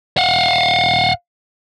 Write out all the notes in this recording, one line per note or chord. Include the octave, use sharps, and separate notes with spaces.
F5 F#5